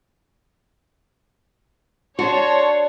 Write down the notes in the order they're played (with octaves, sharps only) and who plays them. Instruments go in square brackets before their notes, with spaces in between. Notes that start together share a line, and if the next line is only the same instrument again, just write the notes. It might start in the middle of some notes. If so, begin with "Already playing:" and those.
[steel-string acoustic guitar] D4 F#4 [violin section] C#5 [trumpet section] A5 C6